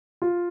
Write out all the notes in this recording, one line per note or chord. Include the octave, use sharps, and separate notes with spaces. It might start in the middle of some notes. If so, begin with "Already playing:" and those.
F4